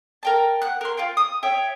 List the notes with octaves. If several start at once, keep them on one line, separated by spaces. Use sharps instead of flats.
A#4 G5 A5
F#5 F#6
A#4 C6
F4 F5 G5
D#6
C#5 E5 G5